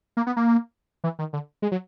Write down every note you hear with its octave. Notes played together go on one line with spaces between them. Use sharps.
A#3
B3
A#3
E3
D#3
D3
G#3
F#3